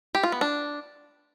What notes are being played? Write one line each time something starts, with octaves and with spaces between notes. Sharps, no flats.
G4
F4
B3
D4